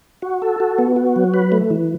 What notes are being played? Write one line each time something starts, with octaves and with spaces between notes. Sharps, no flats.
F#4
A4
F#4
B3
F#4
F#3
B4
A3
E3